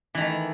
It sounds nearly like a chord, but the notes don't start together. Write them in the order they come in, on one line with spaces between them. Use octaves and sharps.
E3 D#3 A3